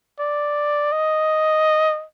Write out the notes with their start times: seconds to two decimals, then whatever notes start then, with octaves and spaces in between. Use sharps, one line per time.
0.20 D5
0.92 D#5